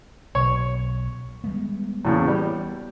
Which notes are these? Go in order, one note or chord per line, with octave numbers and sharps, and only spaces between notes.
B1 C#5
G3 G#3 B3
E2 A2 C#3 B3
G3